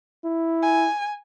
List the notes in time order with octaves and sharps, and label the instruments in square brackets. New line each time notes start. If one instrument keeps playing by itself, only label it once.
[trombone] E4
[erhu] G#5